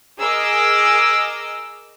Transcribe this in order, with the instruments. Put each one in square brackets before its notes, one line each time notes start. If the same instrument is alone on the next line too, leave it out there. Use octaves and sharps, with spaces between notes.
[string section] G#4 A#4 D#5 D6 E6